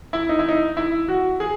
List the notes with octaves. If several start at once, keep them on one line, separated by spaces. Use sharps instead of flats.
E4
D#4
E4
D#4
E4
F#4
G#4